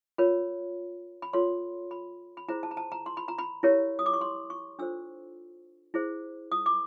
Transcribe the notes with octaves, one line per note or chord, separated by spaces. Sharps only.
F4 A#4 C#5 B5
B5
F4 A4 C#5 C6
B5
B5
E4 G#4 C5 A#5
A5
A#5
A5
A#5
C6
B5
A#5
B5
E4 G4 A#4 C#5
D#6
D6
C#6
C6
C#6
D4 F4 A4 C5 E6
E4 G#4 C5
D#6
D6